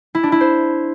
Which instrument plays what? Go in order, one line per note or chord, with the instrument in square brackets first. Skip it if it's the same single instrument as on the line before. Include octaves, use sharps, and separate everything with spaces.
[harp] E4
D4
E4
C5